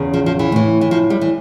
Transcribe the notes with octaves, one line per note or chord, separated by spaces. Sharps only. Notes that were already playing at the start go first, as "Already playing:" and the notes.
Already playing: E2 C#3
F3
F3
E3
A2 E3
E3
F3
G3
E3